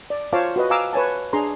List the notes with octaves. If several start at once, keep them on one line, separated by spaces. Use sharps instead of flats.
D5
F4 C5 C#5 F5 A5 D6
F#4 B4 D#5
F5 G#5 A#5 D6 E6
B4 C#5 G#5 A5
D4 G#4 A#5 C6